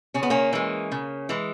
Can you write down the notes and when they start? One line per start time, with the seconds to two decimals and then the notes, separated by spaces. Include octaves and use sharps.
0.14 C#3 C#4
0.23 B3
0.30 A#3 C#4
0.53 E3 G#3
0.92 C#3
1.29 E3 G#3